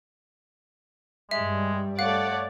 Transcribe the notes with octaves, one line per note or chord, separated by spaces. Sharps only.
G2 G3 G#3 E5
A3 C#5 D5 F5 F#5